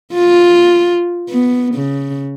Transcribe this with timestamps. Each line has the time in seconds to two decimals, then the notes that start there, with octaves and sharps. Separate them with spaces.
0.13 F4
1.29 B3
1.75 C#3